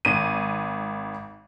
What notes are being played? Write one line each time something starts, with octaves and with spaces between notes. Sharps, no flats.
G#1 D#7